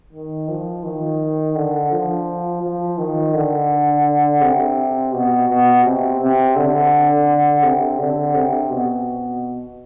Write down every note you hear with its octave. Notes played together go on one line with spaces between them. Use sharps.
D#3
F3
D#3
D3
F3
F3
D#3
D3
C3
B2
B2
C3
C3
D3
C3
D3
C3
B2